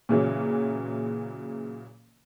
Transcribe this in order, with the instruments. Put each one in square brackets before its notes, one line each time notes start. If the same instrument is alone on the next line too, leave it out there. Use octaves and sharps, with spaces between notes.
[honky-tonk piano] A#2 C#3 E3 F#3